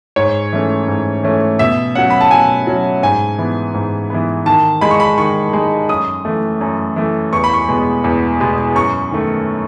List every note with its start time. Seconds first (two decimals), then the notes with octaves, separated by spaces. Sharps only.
0.16 G#2 C#5
0.53 E3 A3 C#4
0.88 G#2
1.23 E3 A3 C#4
1.59 B2 E5
1.95 F#3 C#4 F#5
2.10 B5
2.21 A5
2.31 B2 G#5
2.67 F#3 C#4
3.03 G#2 G#5
3.38 E3 B3
3.74 G#2
4.10 E3 B3
4.46 D#3 A5
4.81 G#3 D#4 B5
4.91 C#6
5.00 B5
5.18 D#3 C#6
5.53 G#3 D#4
5.89 F#2 D#6
6.25 E3 A3
6.61 F#2
6.96 E3 A3
7.33 E2 C#6
7.44 B5
7.53 C#6
7.68 B2 G#3 B3
8.04 E2
8.40 B2 G#3 B3
8.75 F#2 C#6
9.11 D#3 A3